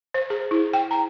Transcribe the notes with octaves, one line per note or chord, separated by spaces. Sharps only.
C5
G#4
E4
G5
A#5